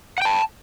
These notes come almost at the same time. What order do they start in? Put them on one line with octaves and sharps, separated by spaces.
F#5 G5 A5